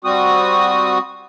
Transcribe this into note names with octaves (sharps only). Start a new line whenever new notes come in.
G3 C4 F#4 D#6